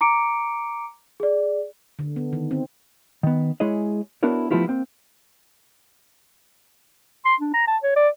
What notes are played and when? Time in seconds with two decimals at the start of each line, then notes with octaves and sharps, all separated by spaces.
0.01 A#5 D6 C#7 D7
1.20 G#4 D5
1.99 D3
2.16 B3
2.33 D#3
2.51 C4
3.23 D#3 B3
3.60 G#3 E4 G#4 C#5 D#5
4.23 B3 D4 E4 F#4 A#4 C#5
4.51 F3 A3 B3 E4 F4 G4
4.67 A#3 C4
7.25 C6
7.40 D4
7.54 A#5
7.68 A5
7.83 C#5
7.96 D5